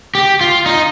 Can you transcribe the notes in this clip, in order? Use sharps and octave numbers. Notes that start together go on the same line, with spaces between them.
G4
F4
D#4